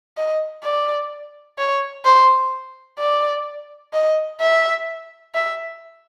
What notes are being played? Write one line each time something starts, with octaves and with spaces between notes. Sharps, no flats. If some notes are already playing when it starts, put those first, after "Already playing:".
D#5
D5
C#5
C5
D5
D#5
E5
E5